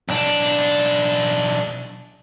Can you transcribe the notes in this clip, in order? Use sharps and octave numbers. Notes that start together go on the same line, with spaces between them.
B1 D4